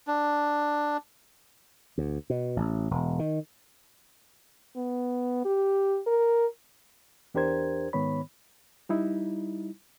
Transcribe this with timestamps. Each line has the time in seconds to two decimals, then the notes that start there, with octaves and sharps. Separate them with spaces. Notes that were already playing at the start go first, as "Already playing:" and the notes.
0.07 D4
1.98 D2
2.30 B2
2.56 A1
2.91 E1
3.19 D#3
4.76 B3
5.45 G4
6.07 A#4
7.34 E2 D4 G4 A#4 C5 G#6
7.93 G#2 D#3 B3 C#5 B5
8.89 G3 D#4 E4